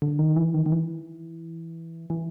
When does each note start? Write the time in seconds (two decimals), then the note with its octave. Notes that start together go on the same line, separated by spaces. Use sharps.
0.02 D3
0.19 D#3
0.36 E3
0.54 D#3
0.66 D#3
0.72 E3
2.10 E3